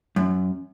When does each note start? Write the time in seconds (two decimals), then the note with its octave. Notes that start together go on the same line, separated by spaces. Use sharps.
0.16 F#2